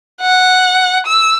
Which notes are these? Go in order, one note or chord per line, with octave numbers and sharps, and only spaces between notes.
F#5
E6